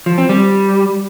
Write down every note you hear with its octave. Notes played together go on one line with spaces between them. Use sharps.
F3
C4
G3